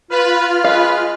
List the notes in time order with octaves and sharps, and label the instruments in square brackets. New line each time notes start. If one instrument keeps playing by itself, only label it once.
[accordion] F4 F6 [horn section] B4
[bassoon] G#3 [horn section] B4 [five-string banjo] F5